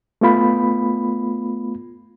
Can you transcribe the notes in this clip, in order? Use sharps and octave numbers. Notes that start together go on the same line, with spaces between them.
A3 B3 F4 B5